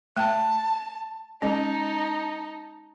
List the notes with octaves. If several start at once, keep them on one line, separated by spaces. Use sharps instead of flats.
A3 G5 A5
G#3 C#4 D#4 A5